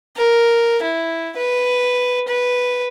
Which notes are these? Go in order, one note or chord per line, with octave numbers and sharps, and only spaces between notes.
A#4
E4
B4
B4